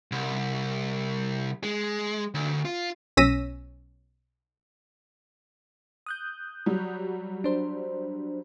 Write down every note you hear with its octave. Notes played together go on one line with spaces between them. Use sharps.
C2
G#3
D2
F4
B1 C#4 E6 A#6 B6 D#7
D#6 F#6 G6
F#3 G3
D4 C5